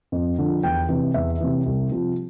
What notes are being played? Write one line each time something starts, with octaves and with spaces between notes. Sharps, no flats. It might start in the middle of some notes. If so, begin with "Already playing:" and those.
F2
D3 F3
E2 G5
C3 E3
E2 E5
C3 E3
C2
C3 F3